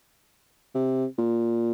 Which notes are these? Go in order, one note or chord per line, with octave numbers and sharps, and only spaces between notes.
C3
A#2